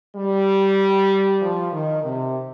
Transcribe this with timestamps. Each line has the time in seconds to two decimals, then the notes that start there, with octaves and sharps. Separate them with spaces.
0.16 G3
1.42 F3
1.73 D#3
2.04 C3